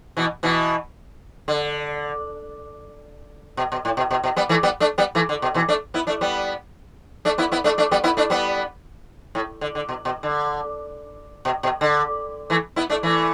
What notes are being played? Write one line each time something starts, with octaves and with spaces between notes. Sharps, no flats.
B2 E3
B2 E3
D3
B2
B2
A2
B2
B2
B2
G3 B3
E3 A3
G3 B3
A3 D4
G3 B3
E3 A3
D3
B2
B2 E3
A3 D4
B3 E4
A3 D4
G3 B3
A3 D4
B3 E4
B3 E4
A3 D4
A3 D4
G3 B3
B3 E4
A3 D4
G3 B3
A2
D3
D3
B2
B2
D3
B2
B2
D3
E3 A3
B3 E4
A3 D4
E3 A3